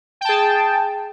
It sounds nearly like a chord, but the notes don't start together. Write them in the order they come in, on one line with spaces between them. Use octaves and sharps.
G5 A5 G#4